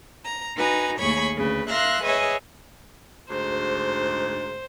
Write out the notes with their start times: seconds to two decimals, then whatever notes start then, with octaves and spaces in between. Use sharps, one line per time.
0.24 A#5
0.55 D#4 F#4 B4 G#5 A#5
0.99 D#2 A3 G#4 C#5 B5 C#6
1.34 D2 C#3 B4
1.69 A#4 E5 F5 C6 F#6 A#6
2.03 G#4 B4 C#5 D#5 E5 G#5
3.30 D2 G#2 C5